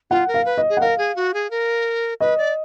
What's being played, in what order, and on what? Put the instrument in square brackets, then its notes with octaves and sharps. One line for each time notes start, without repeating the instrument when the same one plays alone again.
[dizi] F4 [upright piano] F#5
[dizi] A#4
[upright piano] F5
[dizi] B4
[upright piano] D#5
[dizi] G#4
[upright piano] F#5
[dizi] A#4 [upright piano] F5
[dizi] G#4
F#4
G#4
A#4
[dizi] B4 [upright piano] D#5
[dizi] D5